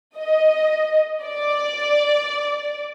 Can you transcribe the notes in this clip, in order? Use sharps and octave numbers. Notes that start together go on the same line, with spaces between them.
D#5
D5